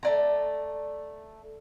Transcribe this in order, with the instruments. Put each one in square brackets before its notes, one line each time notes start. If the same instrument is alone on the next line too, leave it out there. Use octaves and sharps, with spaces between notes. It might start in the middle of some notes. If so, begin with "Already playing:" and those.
[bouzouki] A3 D5 A#5